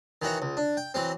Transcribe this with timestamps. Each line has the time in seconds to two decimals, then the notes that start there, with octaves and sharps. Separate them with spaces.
0.22 D#3 E3 F#4 C#5
0.42 C#2
0.57 D4
0.77 G5
0.94 E3 F#3 C4